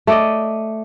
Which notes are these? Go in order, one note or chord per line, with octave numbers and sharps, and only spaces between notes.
A3 D5 D#5